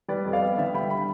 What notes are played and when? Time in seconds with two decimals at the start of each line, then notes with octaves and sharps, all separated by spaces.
0.08 G3 B4 D5
0.25 F2
0.33 D5 F5
0.42 B3
0.58 D3 E5 G5
0.74 G3 G5 B5
0.90 G5 B5